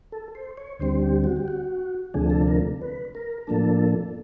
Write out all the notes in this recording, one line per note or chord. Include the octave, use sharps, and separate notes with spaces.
A4
C5
C#5
D2 D3 G3 C4 C5
G4
F#4
G4
F#4
D2 C3 F3 A3 D4 G#4
A4
A#4
B4
A#4
A2 F3 A#3 D4 A4